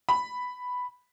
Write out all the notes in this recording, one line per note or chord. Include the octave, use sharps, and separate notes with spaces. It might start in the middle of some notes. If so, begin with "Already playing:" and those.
B5